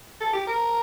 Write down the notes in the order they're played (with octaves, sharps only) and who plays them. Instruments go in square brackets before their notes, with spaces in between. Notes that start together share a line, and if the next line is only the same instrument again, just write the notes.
[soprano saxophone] A4
G4
A#4